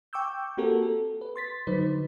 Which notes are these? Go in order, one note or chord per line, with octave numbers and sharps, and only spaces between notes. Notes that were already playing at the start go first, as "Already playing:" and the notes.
G5 C#6 D6 E6 G6
A#3 C4 F#4 G4 A4 A#4
A4
B4
C6 A6 B6
D3 F#3 D#4 B4 C5